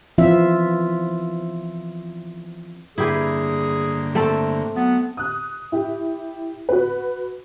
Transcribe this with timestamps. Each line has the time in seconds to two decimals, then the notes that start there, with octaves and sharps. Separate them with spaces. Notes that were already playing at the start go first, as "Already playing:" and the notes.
0.18 E3 F3 C4 F4 E5
2.98 G2 D3 A#3 E4 G4 G#4 B4
4.15 A3 C4 A4
4.76 F#3 B3
5.17 D#6 F#6
5.72 E4 G4
6.69 F#4 B4